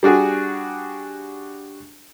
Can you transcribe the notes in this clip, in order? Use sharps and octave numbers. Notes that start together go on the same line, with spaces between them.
G3 D4 F#4 G#4